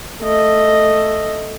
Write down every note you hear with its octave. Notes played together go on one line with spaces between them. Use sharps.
A3 D#5